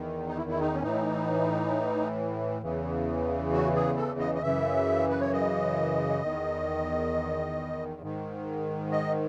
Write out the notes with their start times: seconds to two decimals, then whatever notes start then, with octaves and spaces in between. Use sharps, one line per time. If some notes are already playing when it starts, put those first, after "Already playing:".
Already playing: E2 D#3
0.27 D#4
0.37 E4
0.49 E4
0.60 D#4
0.74 C#4
0.82 A2 E3 D#4
2.62 E2 C#3 E3
3.53 F#4
3.75 G#4
3.97 A4
4.19 D#5
4.35 D#5
4.42 F#2 C#3 E3 E5
5.09 B4
5.20 C#5
5.33 D#5
6.22 E2 D#3
8.02 G#2 D#3
8.92 D#5